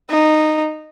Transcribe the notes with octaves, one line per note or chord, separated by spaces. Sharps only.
D#4